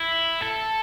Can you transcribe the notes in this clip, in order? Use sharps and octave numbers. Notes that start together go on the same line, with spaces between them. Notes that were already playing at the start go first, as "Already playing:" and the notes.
Already playing: E4
A4